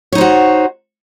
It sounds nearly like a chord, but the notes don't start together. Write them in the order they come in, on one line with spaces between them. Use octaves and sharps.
C#5 D#4 C5 F#4